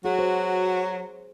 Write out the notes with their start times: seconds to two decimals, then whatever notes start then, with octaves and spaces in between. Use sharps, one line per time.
0.05 F#3 F#4 G#4
0.19 C5